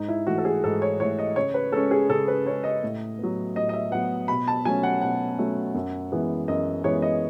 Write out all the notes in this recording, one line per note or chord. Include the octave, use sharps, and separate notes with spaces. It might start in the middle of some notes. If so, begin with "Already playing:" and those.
Already playing: G#2 D#4
E4
E3 A3 F#4
A4
G#4
G#2 A4
C#5
E3 A3 C#5
D#5
C#3 C#5
B4
G#3 C#4 A4
G#4
C#3 A4
B4
G#3 C#4 C#5
D#5
A2
F#3 B3
A2 D#5
D#5
E5
F#3 B3 F#5
B2 B5
A5
F#3 A3 C#4 G#5
F#5
B2 F#5
F#3 A3 C#4
F#2
E3 G#3 B3
F#2 D#5
E3 G#3 B3 C#5
D#5